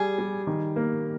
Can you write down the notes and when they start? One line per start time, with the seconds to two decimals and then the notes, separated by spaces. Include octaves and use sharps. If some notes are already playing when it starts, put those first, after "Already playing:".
Already playing: G3 G#4
0.18 G3
0.47 D#3
0.76 A#3